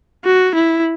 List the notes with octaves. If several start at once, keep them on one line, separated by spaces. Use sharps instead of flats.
F#4
E4